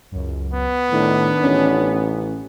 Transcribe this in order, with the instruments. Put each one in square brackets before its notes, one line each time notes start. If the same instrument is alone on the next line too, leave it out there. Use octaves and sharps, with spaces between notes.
[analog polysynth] C#2 F#2
[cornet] B3
[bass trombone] A2 [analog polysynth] D#3 D4 D#4
[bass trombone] A1 [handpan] C#4